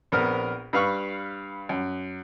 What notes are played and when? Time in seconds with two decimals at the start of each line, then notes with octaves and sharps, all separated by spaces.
0.12 A#1 B3 C4 A#4 F6
0.73 G2 B4 F5 B5 C#6
1.69 F#2